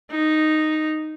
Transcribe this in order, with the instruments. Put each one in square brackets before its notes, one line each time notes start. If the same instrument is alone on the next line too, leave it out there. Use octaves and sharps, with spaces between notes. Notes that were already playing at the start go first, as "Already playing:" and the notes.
[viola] D#4